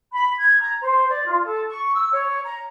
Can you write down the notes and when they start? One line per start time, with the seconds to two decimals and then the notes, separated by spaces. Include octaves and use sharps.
0.13 B5
0.39 G#6
0.61 A#5
0.81 C5
1.09 D5
1.25 F4
1.45 A4
1.71 C#6
1.94 E6
2.11 C#5
2.44 A#5